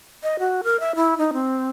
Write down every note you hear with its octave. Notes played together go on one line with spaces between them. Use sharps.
D#5
F#4
A#4
E5
E4
D#4
C4